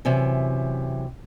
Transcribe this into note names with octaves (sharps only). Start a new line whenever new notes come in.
F#2 C3 E3